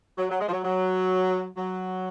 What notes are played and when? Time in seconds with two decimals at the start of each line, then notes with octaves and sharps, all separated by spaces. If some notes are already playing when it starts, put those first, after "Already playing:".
0.18 F#3
0.30 F#3
0.41 G#3
0.48 F3
0.52 F#3
0.64 F#3
1.57 F#3